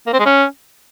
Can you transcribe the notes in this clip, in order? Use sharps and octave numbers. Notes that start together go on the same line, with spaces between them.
A#3
C4
G#3
C#4